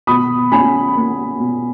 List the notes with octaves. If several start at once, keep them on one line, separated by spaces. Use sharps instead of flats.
B2 B5 D#6
C#4 G#5 B5
A#3
B2